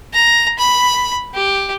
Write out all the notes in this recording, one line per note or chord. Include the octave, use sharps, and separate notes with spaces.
A#5
B5
G4